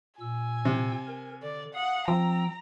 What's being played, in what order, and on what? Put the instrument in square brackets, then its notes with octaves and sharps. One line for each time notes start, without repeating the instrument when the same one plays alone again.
[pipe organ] A#2 E6 [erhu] G#5
[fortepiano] C3
[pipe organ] A#4
[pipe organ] D3 [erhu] D5
[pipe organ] F5 D#6 [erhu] F#5
[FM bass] F3 [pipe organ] C4 G5 E6 [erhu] A#5